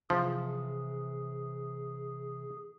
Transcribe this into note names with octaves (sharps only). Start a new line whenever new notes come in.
C3 E3 F3 G#4